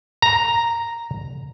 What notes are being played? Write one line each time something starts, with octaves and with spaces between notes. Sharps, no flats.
A#5